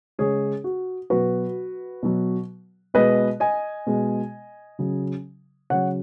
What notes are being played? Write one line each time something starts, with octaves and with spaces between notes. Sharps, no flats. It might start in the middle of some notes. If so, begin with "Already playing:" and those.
C#3 G#3 G#4 C#5
F#4
B2 F#3 F#4 B4
B2 F#3
B2 G#3 B4 D#5
D#5 G#5
B2 G#3
C#3 F#3
C#3 F#3 C#5 F#5